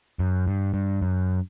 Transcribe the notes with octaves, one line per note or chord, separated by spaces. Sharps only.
F#2
G2
G2
F#2